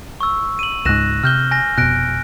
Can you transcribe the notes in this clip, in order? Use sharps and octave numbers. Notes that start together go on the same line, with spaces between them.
C#6 E6
D#7 F#7
C#2 G#2 F#6 A#6 E7
C3 F6 G6 G7
G#5 A#6
F1 B2 F#6 A#6 D7